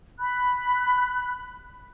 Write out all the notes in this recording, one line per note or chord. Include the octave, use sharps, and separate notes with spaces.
B5 F#6